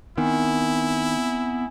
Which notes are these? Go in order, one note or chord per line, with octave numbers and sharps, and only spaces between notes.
D#3 B3 C4 E4 G#5